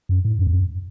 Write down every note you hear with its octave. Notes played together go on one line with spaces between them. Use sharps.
F#2
A2
F#2
E2
F#2